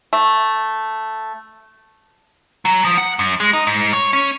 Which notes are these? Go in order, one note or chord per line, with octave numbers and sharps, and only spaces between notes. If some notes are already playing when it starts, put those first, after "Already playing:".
A3
F#3
F3
F#5
F#2
G#3
D#4
G#2
C#5
C#4